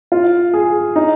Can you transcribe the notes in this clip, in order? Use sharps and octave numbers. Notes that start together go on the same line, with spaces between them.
F4
G#4
D#4